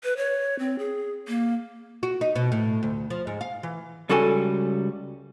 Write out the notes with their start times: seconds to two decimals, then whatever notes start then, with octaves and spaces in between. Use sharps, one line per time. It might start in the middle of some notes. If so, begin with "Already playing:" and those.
0.04 B4
0.17 C#5
0.59 C4
0.79 G#4
1.28 A#3
2.03 F#4
2.21 D#4
2.36 B2
2.52 A2
2.83 D2
3.10 F3
3.27 G#2
3.41 F5
3.63 E3
4.09 C#2 G3 F#4 A4 G#5